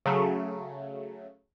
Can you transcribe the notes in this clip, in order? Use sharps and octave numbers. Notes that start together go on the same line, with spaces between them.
C#3 F#3 A3